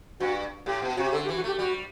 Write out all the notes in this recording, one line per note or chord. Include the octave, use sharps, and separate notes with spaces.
G2 F#4
A2 G4
B2
C3 F#4
G4
D3 A4
G4
E3
F#4
A3 G4
G3 F#4